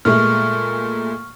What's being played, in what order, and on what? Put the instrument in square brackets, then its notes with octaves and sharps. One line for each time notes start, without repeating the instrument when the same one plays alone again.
[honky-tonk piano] A#2 G#3 A3 [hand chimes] C#6 F6